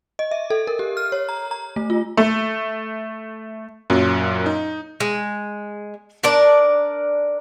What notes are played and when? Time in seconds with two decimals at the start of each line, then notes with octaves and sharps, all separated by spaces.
0.19 D#5
0.31 E5
0.50 A4
0.67 A#4
0.79 G4
0.97 F6
1.12 C#5
1.29 A#5
1.51 A#5
1.76 A3
1.90 F4
2.17 A3
3.90 F#2 A#2 F#3
4.46 D#4
5.00 G#3
6.24 D4 A#4 D5